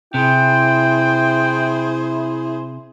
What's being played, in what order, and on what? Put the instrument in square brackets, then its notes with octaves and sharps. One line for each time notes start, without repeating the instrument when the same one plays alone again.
[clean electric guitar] C3 [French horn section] E4 [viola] G#4 C5 [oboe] G5